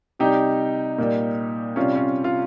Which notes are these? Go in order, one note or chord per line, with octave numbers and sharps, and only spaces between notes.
C3 G3 D#4 G4
A#2 G3
C3 G3 C#4 F4
C#4 F4
F4